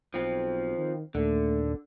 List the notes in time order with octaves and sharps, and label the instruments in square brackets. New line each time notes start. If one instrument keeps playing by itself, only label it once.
[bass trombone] B1 [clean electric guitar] F3 C4
[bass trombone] D#3
[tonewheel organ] D#2 A#2 [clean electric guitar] D3 [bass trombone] A3